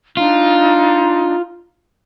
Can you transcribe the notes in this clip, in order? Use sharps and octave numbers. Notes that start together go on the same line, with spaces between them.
D4 D#4 F4